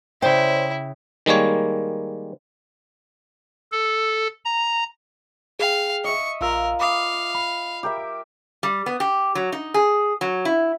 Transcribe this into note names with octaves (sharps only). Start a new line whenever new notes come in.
C#3 E4 C5 D5 G5
D#3 G3 G#3 A#3 C#5
A4
A#5
G#4 F5 G5
D#5 E5 C#6
A#1 F4 A#4 E6
F5 B5 D6 D#6
B5
G4 A#4 E5
G3
B3
G4
F#3
D#4
G#4
F#3
E4